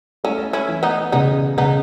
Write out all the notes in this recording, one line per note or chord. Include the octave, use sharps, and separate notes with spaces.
A3 C#4 E4
C#4 E4
E3
B3 D#4
C#3 B3 D#4
C#3 B3 D#4